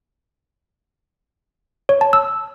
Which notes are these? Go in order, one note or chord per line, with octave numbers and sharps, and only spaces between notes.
C#5
A5
E6